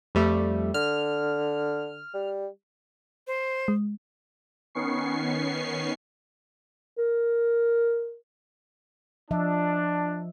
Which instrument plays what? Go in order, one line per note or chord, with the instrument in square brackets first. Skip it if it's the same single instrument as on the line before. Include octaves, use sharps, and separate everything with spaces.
[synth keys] F2 G3 A3
[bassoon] D3 [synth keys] F6
[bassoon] G3
[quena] C5
[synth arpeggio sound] G#3
[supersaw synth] D#3 B3 C#4 C#6 C7
[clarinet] A#4
[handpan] F3 D#5 E5 [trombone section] D4